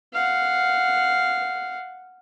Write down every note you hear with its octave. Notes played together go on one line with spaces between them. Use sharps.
F5 F#5